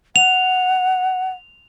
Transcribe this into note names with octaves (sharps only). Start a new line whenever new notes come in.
F#5 F7